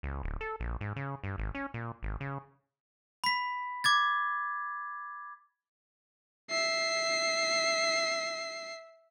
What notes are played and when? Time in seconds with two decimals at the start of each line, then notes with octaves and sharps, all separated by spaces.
0.03 C#2
0.23 D1
0.41 A4
0.60 A#1
0.81 G#2
0.96 C#3
1.24 G2
1.38 G#1
1.55 C#4
1.74 A#2
2.03 G#1
2.20 C#3
3.24 B5 B6
3.84 D6 G#6 A6
6.50 E5 C7